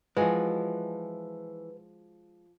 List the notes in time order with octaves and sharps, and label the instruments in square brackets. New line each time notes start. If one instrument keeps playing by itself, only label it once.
[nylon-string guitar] E3 G#4 D#5 [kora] F3 F#4 [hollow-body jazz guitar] G#3 [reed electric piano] B4